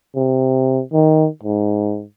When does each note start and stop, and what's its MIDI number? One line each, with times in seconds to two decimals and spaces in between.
0.15 0.82 48
0.93 1.27 51
1.43 2.03 44